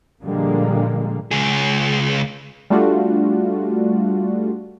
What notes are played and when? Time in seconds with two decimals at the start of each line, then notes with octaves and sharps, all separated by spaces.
0.23 A#2 D3 F3 G3 G#3 A#3
1.31 C#2 G#4
2.70 G3 A3 D4 F4 F#4